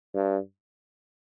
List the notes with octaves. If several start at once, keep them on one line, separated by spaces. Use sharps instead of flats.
G2